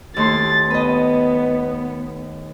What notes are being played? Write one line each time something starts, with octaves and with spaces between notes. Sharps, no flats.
D#2 A3 C6 A6
B3 B4 D#5